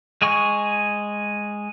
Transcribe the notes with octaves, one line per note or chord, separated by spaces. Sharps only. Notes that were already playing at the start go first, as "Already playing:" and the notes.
G#3 G#4 G#5 C#6